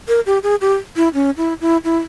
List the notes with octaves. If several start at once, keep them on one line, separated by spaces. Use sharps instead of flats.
A#4
G4
G#4
G4
E4
C#4
E4
E4
E4